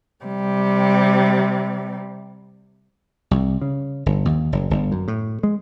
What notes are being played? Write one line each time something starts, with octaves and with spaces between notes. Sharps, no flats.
C3 G3
C2
C#3
G1
D#2
F#1
G1
F#2
A2
G#3